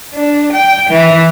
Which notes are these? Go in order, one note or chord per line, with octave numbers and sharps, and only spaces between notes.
D4
G5
E3